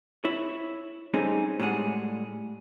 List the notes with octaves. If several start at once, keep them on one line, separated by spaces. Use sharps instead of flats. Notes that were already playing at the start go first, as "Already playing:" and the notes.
E4 C#5
G3 A3 C4 C#4 D#4 G#4
A2 G3 G#3 G#4 F#5